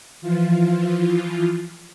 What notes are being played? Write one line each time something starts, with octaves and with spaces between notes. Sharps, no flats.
E3 F3 F4